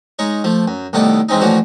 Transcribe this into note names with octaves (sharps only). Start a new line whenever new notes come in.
G#3 D#4 C#5
F3 A3
F#2
C2 A2 D#3 B3 A4 D5
E3 G#3 C4 C#4 D#4
A2 E3 F3 C#4 D4 F#4